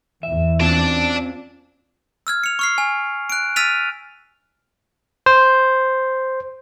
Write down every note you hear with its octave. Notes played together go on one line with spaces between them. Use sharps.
E2 E3 E5
C4 C#4 F4 D5 A5
E6 F6 G#6
C#7 F7
C#6 F6 C7
G#5
F#6 D7
E6 F6 A6 B6 D#7 F7
C5